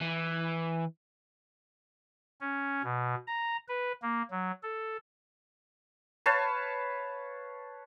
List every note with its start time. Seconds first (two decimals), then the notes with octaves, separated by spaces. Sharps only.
0.01 E3
2.41 C#4
2.84 B2
3.27 A#5
3.68 B4
4.02 A#3
4.31 F#3
4.63 A4
6.26 B4 C#5 F5 A5